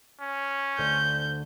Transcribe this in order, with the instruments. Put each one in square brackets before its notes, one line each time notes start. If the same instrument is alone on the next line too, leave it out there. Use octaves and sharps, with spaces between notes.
[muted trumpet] C#4
[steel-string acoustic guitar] D2 D3 C5 [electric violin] G6